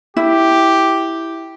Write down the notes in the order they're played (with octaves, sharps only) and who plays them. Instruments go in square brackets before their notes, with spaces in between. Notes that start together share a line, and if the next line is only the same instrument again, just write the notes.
[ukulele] E4 [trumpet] G4